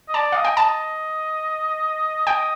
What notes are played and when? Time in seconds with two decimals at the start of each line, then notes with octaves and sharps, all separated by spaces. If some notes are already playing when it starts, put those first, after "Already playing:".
0.08 D#5
0.14 D5 A5
0.32 D#5 F5
0.44 G5
0.56 D#5 A5
2.27 D#5 G5